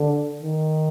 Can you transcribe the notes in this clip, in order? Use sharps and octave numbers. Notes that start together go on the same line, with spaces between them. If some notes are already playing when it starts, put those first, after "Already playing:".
Already playing: D3
D#3